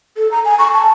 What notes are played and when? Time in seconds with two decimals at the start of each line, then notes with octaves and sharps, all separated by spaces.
0.17 A4
0.31 A#5
0.45 G#5
0.59 C#6
0.74 A5